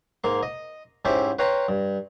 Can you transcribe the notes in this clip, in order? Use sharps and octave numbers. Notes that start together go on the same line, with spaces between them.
G#2 A#3 C6
D#5
G#2 C#4 E4 G4 C5 E5
B4 C#5 F5 G5 A#5 C6
G2